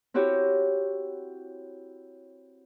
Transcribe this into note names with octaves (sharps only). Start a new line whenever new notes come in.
C4 E4 F#4 G4 C#5